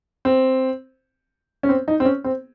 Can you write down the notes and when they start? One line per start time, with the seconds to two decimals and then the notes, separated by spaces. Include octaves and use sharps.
0.25 C4
1.63 C#4
1.69 C4
1.88 D#4
2.00 C4
2.05 C#4
2.24 C4